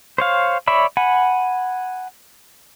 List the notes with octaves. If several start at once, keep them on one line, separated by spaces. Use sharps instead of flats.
C5 C#5 F5
C#5 D5 E5 B5
F#5 G#5 B5